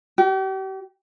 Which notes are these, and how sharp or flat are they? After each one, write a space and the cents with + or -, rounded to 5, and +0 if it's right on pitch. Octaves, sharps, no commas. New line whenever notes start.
G4 -40